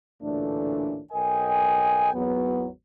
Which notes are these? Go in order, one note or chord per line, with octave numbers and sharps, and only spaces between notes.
A1 D2 A#2 E3 A3 D4
B1 A#4 D#5 G5 G#5
G#1 E2 F#3 B3